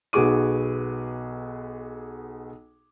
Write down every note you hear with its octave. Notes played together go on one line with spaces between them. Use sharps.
B1 B3 F#4 G#4 D6 D#7